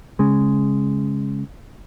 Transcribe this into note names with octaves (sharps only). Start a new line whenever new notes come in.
C#3 G#3